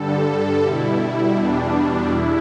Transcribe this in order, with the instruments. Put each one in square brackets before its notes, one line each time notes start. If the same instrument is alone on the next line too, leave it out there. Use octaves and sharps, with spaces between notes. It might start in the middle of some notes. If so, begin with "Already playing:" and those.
Already playing: [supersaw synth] G2 D3 G3 A4
B2 G3 E4
E2 B2 G3 D4
E2 E4